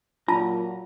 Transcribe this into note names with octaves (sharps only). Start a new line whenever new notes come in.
A#2 F#3 F4 A5 A#5